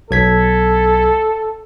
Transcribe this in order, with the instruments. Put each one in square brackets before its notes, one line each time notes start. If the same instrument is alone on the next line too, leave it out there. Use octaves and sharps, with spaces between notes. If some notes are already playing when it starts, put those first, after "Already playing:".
[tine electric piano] B1 G#6 B6 [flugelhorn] A4